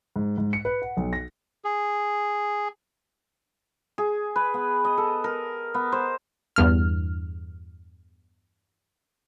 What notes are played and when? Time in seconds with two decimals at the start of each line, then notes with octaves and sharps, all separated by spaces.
0.16 G#2
0.38 G#2
0.53 C#7
0.65 B4
0.82 F#5
0.97 B1
1.13 A#6
1.64 G#4
3.98 G#4
4.36 B4
4.54 B3
4.85 D#5
4.98 A4
5.24 A#4
5.74 B3
5.92 C5
6.56 E2 G2 F6